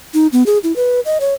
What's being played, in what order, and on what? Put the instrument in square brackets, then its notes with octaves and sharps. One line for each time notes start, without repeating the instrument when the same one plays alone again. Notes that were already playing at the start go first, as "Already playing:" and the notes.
[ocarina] D#4
B3
G#4
E4
B4
D#5
C#5